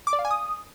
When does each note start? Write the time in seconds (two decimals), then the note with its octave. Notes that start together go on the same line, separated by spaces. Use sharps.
0.07 D6
0.13 D5
0.19 F5
0.25 G#5
0.31 D#6